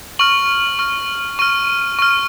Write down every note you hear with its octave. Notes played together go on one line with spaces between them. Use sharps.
C#6 F6 F#7
C#6 F6
C#6 F6 D#7
C#6 F6